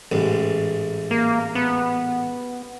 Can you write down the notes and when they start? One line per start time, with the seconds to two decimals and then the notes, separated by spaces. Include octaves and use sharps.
0.12 A1 G#2
1.11 A#3
1.55 B3